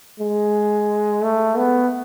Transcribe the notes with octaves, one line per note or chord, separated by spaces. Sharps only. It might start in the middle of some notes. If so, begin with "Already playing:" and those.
G#3
A3
B3